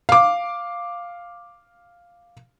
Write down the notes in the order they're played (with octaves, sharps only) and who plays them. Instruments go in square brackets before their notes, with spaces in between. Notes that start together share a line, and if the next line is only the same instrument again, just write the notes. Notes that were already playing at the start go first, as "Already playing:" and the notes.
[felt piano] F5 D6